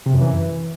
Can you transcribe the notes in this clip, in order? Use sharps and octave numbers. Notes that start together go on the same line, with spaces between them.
C3
F#2
E3